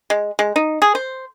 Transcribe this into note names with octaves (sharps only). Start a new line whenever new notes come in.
G#3
G#3
D#4
G#4
C5